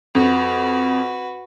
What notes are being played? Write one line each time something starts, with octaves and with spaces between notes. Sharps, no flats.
F2 F#4 B4